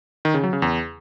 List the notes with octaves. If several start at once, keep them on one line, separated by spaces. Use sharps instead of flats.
D#3
C#3
F#3
C#3
E2